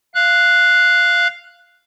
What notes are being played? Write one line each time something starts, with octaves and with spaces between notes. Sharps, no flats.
F5 F#6